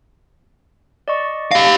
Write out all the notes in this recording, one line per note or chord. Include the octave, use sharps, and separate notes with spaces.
D5 D#5 C#6
G4 F5 A#6